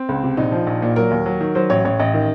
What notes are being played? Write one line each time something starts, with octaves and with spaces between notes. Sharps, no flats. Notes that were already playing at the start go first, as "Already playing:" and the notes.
Already playing: C4
C#2
C3
A#1 D#4
F3
A#1
A#2
F#3 A#4
D#2
F#3
D#3
F#3 C5
A1 C#5
A1 C#5
A1 D#5
D#3